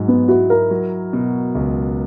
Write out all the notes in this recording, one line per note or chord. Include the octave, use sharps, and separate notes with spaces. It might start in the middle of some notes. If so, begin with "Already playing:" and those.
Already playing: G#2 F#3
B3
E4 F#4
A#4
F#3
B2
C#2